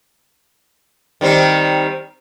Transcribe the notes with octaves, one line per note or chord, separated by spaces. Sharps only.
D#3 G3 C4